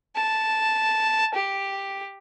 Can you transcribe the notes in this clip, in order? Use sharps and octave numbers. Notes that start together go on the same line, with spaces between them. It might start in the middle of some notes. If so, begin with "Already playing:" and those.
A5
G4